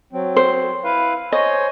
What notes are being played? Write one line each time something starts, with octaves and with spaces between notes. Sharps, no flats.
F#3 C4
C5
E4 B4 F5
C5 C#5 D#5 G#5